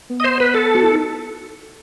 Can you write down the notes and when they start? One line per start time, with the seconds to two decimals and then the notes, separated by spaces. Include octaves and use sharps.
0.10 B3
0.20 D#5
0.24 C5
0.40 B4
0.55 A4
0.75 F#4
0.83 E4
0.92 D#4